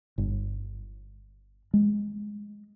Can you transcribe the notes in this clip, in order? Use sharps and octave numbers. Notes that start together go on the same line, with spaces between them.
G1
G#3